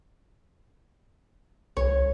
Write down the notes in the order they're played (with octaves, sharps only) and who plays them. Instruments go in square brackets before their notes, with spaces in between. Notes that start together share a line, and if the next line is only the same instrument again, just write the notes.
[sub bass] C2 [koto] C#5